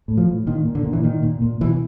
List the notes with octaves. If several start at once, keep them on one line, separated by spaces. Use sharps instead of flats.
A2
F3
A2
A#2 D#3
A#2
D3
A#2
E3
A#2 D#3
A#2
A#2
B2 E3